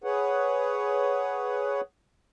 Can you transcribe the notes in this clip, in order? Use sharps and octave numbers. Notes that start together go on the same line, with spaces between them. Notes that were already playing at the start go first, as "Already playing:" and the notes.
G#4 B4 C#5 F#5